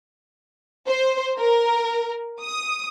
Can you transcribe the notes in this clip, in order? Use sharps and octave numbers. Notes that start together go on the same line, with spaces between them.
C5
A#4
D#6